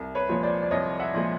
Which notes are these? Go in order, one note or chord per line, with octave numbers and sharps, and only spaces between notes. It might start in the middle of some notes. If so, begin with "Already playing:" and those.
Already playing: C2
B4 C#5
A#2 F3 G#3 C#5
C5 D5
D5
C2 C#5 D#5
E5 F#5
A#2 F3 G#3